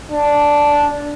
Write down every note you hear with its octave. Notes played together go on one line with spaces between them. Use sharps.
D4